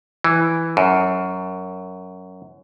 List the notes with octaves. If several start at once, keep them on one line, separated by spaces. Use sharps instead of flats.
E3
F#2